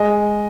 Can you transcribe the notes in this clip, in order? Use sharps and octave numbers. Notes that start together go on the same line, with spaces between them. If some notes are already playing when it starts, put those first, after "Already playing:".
Already playing: G#3 D#5